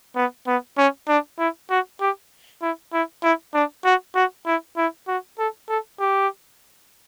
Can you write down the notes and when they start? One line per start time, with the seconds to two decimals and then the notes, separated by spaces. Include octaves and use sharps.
0.16 B3
0.47 B3
0.78 C#4
1.08 D4
1.39 E4
1.70 F#4
2.01 G4
2.62 E4
2.93 E4
3.23 E4
3.54 D4
3.85 F#4
4.15 F#4
4.46 E4
4.77 E4
5.07 F#4
5.38 A4
5.69 A4
6.00 G4